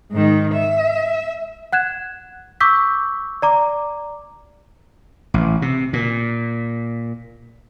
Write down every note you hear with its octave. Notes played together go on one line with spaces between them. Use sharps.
G#2 D#3
E5
F#5 F#6 G#6 E7
C#6 D6 E6 G6 B6
D5 A#5 D6
A1
C3
A#2